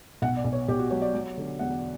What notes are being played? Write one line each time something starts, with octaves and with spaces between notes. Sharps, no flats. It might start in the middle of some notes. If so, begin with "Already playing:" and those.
B1 F#5
D5
B1
C#5
B1 G4
F#4
F#3 C#5
D5
F#3
D3
E2 F#5